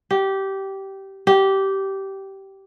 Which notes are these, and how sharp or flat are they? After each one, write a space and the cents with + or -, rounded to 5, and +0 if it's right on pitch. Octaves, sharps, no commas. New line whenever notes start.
G4 -15
G4 -15